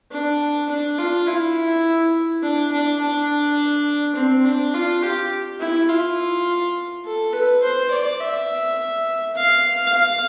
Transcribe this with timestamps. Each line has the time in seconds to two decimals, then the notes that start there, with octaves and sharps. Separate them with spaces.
0.12 D4
0.70 D4
0.98 F4
1.27 E4
2.43 D4
2.72 D4
3.01 D4
4.16 C4
4.45 D4
4.74 F4
5.03 G4
5.60 E4
5.89 F4
7.05 A4
7.33 B4
7.63 C5
7.91 D5
8.20 E5
9.36 F5
9.94 F5